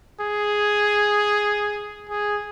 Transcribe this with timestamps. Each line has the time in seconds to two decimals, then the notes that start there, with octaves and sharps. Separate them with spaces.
0.21 G#4
2.09 G#4